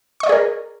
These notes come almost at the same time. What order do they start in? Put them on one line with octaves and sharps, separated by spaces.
C#6 D#5 D5 G#4 A#4